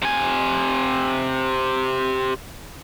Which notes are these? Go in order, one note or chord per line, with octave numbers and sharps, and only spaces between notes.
C3 G#5